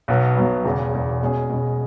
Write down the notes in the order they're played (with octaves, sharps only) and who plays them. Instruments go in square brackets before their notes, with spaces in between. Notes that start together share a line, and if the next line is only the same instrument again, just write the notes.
[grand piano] B1 B2 F#3 B3
B1 B2 F#3 B3
E1 E2 C#3
E1 E2 C#3
B2 G#3 C#4 G#4
B2 G#3 C#4 G#4